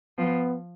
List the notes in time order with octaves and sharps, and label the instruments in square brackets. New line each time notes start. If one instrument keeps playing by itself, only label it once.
[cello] F3 [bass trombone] B3